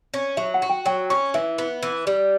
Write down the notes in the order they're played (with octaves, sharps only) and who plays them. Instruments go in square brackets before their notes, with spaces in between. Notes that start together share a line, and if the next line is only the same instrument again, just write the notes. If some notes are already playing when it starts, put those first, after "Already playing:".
[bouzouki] C#4
[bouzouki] F#3 [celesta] E5
[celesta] F#5
[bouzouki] F#4
[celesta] G5
[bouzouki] F#3 [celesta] G5
[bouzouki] C#4 [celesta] C#6
[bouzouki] E3 [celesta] E5
[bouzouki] B3
E3
G3